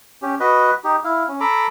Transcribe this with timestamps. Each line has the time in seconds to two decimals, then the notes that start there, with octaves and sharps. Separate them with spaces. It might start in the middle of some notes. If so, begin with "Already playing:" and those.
0.22 C#4 G4
0.40 F#4 B4 D#5
0.84 D#4 G4
1.04 E4 F5
1.28 C#4
1.40 A4 A#5 B5 D6